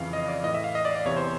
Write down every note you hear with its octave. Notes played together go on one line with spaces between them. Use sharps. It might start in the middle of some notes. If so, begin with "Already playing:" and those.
Already playing: F2 C#3 E3 F5
D#5
D5
A2 E3 D#5
E5
F5
D#5
D5
D5
E2 C3 E3 C#5
C5